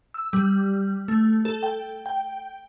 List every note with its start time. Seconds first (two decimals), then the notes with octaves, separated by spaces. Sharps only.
0.14 E6
0.33 G3
1.08 A3
1.45 A4
1.63 G5
2.06 G5